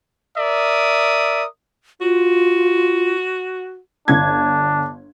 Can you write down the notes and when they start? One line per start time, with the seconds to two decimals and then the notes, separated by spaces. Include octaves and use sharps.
0.38 A#4 D5 E5 D#6
2.01 F4 F#4
4.08 G1 D4 G#6